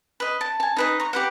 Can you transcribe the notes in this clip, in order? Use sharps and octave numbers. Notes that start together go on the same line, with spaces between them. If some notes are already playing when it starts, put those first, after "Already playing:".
B4 D#5
A5
G#5 A5
D#4 B4 D#5
A#5 C#6
G4 B4 F#5